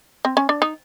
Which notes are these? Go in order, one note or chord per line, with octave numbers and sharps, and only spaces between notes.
C4
C#4
D4
D#4